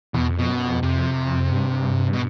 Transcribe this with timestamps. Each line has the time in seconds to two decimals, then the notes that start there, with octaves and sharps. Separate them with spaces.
0.14 E2 B2
0.31 F2
0.38 B2
0.49 F#2
0.66 F2
0.83 F2 C3
1.51 G2
2.14 B2